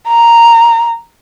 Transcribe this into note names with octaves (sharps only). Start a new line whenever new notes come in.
A#5